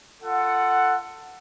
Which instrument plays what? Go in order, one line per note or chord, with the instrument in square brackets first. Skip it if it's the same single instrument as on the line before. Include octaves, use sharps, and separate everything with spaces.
[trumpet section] F4 A4 F#5